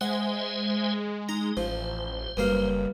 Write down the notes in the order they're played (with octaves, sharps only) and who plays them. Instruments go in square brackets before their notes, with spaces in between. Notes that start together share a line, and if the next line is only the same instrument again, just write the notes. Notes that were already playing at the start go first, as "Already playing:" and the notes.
[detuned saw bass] G#3 [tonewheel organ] C5 E5 G#5 [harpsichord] F#5
[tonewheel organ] D#4 [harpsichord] A#5
[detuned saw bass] A1 [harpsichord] F3 [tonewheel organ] C5
[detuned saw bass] F#1 [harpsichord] G2 A#3 F5